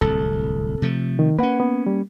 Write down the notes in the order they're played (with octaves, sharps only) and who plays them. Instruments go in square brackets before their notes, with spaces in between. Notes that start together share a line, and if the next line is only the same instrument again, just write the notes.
[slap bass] D1 C2 [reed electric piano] A4
[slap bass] C3 F3 A3
[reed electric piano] D#3
[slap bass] A#3 C#4 [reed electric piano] B4 F#5
[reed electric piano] B3
G3